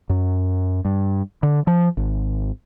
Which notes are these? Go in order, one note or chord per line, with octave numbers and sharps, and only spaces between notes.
F#2
G2
D3
F3
G#1